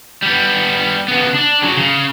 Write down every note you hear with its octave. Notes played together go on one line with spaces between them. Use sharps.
G3 B3
C#3 B3
D4
C#3 F#3
C#3